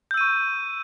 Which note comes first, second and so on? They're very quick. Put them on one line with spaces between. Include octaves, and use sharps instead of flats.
G6 E6 D#7 C#6